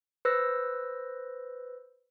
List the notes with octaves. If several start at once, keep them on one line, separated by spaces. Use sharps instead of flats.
B4 C5 E6 A#6